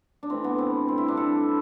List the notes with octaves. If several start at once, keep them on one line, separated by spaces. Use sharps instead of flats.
D4
A2 E3 A3 C4
B3
C4
A2 G3 C4
E4
D4
A4